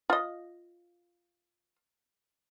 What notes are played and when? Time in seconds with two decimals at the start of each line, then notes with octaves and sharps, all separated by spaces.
0.10 F4 D#5